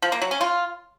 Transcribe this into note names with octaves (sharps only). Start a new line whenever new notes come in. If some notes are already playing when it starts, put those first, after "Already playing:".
F3
A#3
F#3
C#4
F4